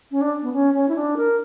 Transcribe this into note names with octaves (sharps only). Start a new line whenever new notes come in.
C#4
D4
B3
C#4
C#4
E4
D4
A#4